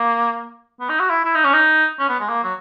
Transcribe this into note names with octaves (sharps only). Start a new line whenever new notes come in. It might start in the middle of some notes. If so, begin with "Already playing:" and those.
Already playing: A#3
B3
D#4
F#4
E4
E4
D#4
C#4
D#4
C#4
B3
G#3
A#3
F#3